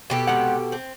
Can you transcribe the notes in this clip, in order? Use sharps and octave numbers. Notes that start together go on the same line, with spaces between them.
B2 G4 A4
C3 G#3 F#5
C4